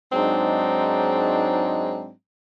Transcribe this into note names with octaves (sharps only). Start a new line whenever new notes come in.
G#2 F#3 G#3 C4 D4 D#4